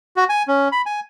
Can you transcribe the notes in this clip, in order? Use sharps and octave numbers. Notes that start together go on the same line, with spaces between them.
F#4
G#5
C#4
B5
G#5